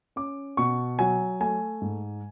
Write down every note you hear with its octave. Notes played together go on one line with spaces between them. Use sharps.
C#4 D6
B2 C#6
F#3 G#5
A3 G#5
G#2